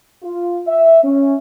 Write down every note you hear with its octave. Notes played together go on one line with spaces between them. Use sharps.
F4
E5
C#4